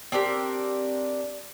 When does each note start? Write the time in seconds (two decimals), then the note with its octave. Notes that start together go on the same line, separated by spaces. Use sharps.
0.12 C4 D4 G4 A#4